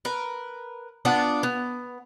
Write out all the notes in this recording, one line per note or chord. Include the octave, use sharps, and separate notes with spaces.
A#4 B4
B3 D4 F4 F#5
B3